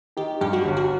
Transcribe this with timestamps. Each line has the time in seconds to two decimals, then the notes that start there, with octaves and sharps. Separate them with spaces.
0.17 D#3 G4
0.41 G2 G4
0.53 F#4
0.65 G1
0.77 F#4